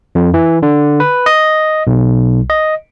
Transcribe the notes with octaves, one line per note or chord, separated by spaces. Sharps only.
F2
E3
D3
B4
D#5
B1
D#5